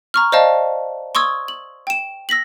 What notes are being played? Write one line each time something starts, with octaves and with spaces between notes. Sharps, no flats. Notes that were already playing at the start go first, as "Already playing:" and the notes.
A#5 C#6 F6
C5 D5 D#5 F5 A5
C6 C#6 D#6 E6 G#6
F#7
G5 E7
E6 A#6 B6 F#7